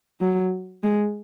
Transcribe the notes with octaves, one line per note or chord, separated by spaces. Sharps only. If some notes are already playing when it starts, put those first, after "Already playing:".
F#3
G#3